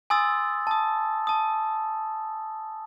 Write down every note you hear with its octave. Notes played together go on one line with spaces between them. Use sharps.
G#5 C6 D#6 E6 A6
A5 D#6
A5 D#6